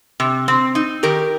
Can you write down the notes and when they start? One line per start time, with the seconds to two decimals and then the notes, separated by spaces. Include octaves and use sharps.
0.20 C3
0.48 C4
0.75 D#4
1.03 D#3 G4 A#4